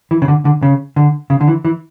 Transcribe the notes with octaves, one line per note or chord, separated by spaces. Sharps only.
E3
C#3
D3
D3
C#3
D3
C#3
D3
E3
E3